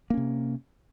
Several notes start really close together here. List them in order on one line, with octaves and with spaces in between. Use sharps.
A#3 C#4 C3